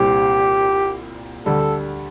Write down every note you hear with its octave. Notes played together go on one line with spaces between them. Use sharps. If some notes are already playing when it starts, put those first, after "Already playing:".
Already playing: C2 A#2 G3 C4 G4
D2 D3 G3 A4